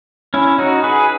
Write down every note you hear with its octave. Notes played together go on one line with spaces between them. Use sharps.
C#4 E4
D#4 F#4
G#4 B4